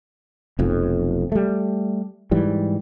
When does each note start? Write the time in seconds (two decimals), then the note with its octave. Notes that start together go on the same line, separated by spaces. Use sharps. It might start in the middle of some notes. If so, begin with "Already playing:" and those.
0.59 F1 B1 F2
1.32 G3 A3
2.31 G#2 E3 G3